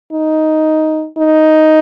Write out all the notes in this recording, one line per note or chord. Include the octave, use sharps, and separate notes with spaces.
D#4
D#4